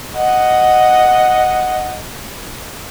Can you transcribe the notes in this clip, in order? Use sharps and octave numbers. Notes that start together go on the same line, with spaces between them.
D#5 F#5